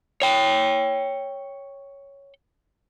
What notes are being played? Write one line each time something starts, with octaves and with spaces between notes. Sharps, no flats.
C#5 G5